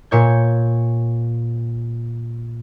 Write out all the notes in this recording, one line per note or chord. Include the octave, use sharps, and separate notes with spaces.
A#2 C#5 G6